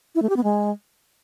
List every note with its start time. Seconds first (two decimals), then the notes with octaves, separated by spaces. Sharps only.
0.15 E4
0.22 A3
0.29 G4
0.37 B3
0.44 G#3